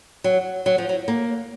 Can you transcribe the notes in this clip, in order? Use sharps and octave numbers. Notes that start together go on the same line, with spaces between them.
F#3
F#3
F3
F#3
A#3